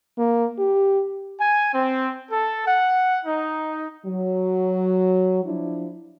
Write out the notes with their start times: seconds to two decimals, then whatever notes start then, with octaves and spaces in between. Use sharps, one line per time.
0.18 A#3
0.59 G4
1.40 G#5
1.74 C4
2.31 A4
2.67 F#5
3.25 D#4
4.06 F#3
5.44 F3 D4 E4